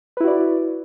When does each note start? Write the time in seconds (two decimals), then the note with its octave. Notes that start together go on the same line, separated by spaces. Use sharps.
0.17 B4
0.20 E4
0.24 F#4
0.27 D5